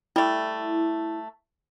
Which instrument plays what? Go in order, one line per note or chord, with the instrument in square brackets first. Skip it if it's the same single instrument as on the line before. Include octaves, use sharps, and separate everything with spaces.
[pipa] G3 A3 [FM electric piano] E4